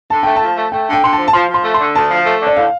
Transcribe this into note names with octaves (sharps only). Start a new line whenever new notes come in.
D3 A5
A3 G5
F3 A5
A3
A3 G5
D3
G5
D3 C6
A5
F3
A5
F3 C6
F3
C6
A3
C6
D3
D2 A5
F3
A3
D3
D5
A2 F5